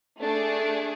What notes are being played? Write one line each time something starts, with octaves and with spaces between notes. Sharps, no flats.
A3 D4 G#4